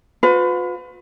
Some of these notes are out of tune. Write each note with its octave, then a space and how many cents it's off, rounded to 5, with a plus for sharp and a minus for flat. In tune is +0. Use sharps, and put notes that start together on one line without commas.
F4 +45 B4 +30